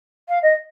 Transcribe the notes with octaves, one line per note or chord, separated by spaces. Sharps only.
F5
D#5